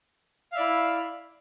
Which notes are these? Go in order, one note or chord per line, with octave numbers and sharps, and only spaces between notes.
E4 D5 E5 F5